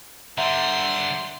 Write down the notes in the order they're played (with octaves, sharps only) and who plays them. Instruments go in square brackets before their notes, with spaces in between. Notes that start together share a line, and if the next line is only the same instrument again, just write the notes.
[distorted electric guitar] D3 G3 [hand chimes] E5 F#5 A#5 [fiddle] C6